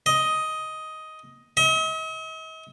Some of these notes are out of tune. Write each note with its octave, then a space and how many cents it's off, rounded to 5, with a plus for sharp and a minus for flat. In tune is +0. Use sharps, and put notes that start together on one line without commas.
D#5 +10
D#5 +45